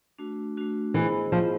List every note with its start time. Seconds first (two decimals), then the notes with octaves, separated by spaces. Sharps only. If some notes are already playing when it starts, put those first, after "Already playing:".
0.19 A3 D4 F#4
0.57 A3 D4 F#4
0.94 E3 B3 E4 G#4 C5 D#5
1.32 F3 B3 E4 G#4 C5 D#5